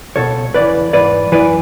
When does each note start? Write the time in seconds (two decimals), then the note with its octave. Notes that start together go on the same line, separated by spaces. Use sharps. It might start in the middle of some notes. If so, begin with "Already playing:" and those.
0.16 C#2 B2 A4 C#5
0.54 E2 C#3 E3 B4 D5
0.93 G#2 E3 B4 D5
1.32 F#2 E3 B4 D5